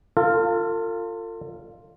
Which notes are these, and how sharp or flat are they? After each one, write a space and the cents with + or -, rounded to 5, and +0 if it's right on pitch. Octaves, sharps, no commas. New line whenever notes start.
F4 +0 A4 +40